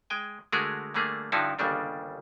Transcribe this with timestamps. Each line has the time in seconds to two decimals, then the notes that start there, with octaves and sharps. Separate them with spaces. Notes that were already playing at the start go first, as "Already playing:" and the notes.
0.10 G#3 G5 G#5
0.52 D3 G#3 A3 F#4 G#4 A#4
0.94 D3 G3 A3 A#3 G#4
1.32 G2 D3 F3 D#4 E4 F#4
1.59 G1 D#2 C#3 G3 D4